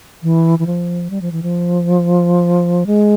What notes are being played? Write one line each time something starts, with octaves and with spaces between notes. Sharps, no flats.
E3
E3
F3
G3
F3
E3
F3
G#3